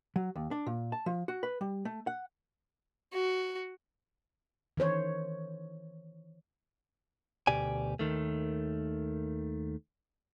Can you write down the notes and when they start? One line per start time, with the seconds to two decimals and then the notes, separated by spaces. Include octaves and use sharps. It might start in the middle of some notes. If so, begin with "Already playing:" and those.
0.16 F#3
0.36 D#2
0.51 D4
0.67 A#2
0.92 A5
1.06 F3
1.28 F#4
1.43 B4
1.61 G3
1.85 A3
2.07 F#5
3.13 F#4
4.77 D#3 E3 C5 C#5
7.47 D2 B2 G4 D5 G#5
7.99 D#2 D#3 A3